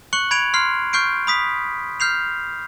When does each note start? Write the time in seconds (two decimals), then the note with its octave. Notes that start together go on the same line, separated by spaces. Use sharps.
0.13 C#6 F#6 C#7 F#7
0.31 B5 G#6 D7 F7
0.54 C6 F6 C7
0.93 C#6 F6 G6 C7 D7
1.27 B5 D#6 B6
2.00 F6 G6 C7 F7